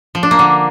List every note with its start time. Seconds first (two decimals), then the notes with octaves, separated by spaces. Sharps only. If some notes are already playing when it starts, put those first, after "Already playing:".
0.15 F3
0.23 D4
0.31 A#3
0.39 D3